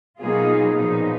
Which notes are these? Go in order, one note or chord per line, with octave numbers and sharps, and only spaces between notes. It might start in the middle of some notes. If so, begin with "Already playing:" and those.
B2 F#3 A#3 D#4 F4 G#4
A#2 F3 B3 D#4